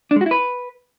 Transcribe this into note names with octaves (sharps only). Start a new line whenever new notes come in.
D4
G#3
F#4
E4
B4